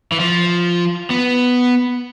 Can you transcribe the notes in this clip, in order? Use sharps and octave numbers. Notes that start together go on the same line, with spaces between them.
E3
F3
B3